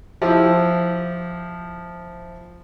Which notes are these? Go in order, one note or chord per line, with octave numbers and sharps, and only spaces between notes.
F3 E4 G4